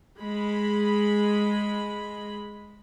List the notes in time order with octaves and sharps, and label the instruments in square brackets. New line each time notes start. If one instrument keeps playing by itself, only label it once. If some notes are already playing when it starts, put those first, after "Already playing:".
[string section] G#3 B5